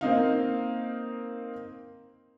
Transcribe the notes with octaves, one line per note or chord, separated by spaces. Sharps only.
A#3 C4 D#4 F5